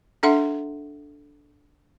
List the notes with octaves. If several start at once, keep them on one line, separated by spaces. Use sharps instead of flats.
D4 A4 E5 F#5 C6